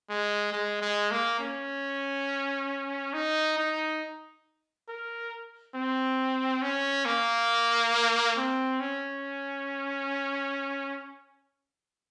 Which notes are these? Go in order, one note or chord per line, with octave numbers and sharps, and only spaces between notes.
G#3
G#3
G#3
A#3
C#4
D#4
D#4
A#4
C4
C#4
A#3
C4
C#4